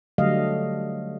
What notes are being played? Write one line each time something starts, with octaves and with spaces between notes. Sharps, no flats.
D3 F#3 G3 A3 D#5 F5